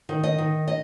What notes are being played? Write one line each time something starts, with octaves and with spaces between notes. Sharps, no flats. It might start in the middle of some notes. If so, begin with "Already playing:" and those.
D#3
D#5
D#3
D#5